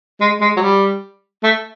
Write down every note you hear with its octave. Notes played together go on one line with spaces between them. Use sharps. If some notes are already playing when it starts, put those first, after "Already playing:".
G#3
G#3
F#3
G3
A3